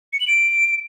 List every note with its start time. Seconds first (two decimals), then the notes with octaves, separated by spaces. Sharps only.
0.13 C#7
0.20 F#7
0.28 D7